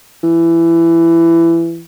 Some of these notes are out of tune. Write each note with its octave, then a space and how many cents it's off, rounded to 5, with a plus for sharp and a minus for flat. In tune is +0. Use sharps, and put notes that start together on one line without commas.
E3 +20